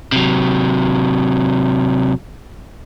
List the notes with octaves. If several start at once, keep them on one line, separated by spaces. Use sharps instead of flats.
C3 F#3